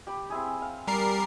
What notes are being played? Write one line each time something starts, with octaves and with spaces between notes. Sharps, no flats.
G4 B5
C4 E4 G#4
F5
G3 A#4 C7